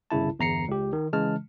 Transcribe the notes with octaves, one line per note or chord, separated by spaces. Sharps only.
G1 C2 C#3 E4 A5
G1 E2 A#5 C7 C#7
C#2 G4
D#3
C#3 E3 G#3 A5 F6